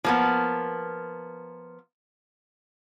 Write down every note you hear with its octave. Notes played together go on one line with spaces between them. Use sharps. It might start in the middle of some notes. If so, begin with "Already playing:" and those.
F3 A#3 B3